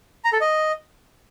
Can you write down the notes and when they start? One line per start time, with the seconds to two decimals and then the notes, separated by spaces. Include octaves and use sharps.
0.24 A#5
0.33 A4
0.41 D#5